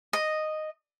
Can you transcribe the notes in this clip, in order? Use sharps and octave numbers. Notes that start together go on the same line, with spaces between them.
D#5